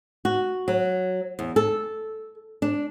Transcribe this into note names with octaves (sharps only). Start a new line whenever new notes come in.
F#4
F#3
E2
A4
D4